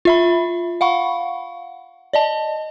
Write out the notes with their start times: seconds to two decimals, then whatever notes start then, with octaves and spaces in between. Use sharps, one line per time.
0.05 F4 E5 B5
0.81 F5 F#5 B5 C#6
2.13 D5 D#5 A5